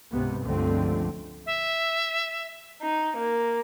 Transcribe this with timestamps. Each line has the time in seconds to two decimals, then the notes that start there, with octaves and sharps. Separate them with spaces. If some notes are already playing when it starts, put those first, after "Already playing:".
0.12 C#2 G#2 C3 B3
0.43 C#2 G2 D3 F3 A3 C4
1.46 E5
2.82 D#4
3.17 A#3